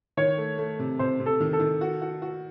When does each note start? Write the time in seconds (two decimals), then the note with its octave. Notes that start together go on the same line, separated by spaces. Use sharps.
0.17 D#3 C#5
0.37 A3
0.58 A3
0.79 C3
0.99 C3 C5
1.20 C3
1.26 A4
1.40 D#3
1.53 A4
1.60 D#3
1.81 F#4
2.01 F#4
2.22 F#4